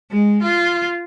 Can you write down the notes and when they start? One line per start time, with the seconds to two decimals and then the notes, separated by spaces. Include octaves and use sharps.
0.12 G#3
0.42 F4